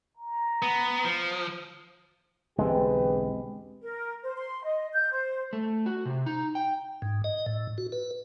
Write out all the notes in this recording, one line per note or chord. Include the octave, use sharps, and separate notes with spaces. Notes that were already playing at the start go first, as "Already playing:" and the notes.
A#5
B3
F3
B1 E2 D3 G#3 C4 G4 G#4 B4
A#4
C5
C6
D#5
G6
C5
A3
F#4
C3
D#4
G5
G#2
D#5
A2
F#4
B4